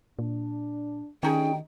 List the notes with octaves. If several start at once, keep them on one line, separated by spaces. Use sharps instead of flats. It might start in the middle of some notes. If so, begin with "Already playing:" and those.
A#2 D4
D2 D#3 C#4 D#4 G4 G#4 D#5 G5